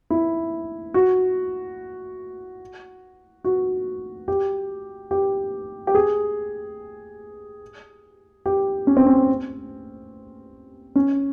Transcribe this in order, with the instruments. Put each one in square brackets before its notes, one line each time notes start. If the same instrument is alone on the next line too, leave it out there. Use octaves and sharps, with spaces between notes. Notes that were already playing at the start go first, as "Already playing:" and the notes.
[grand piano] E4
F#4
F#4
G4
G4
G4
G#4
G4
C#4
C4
C#4
C#4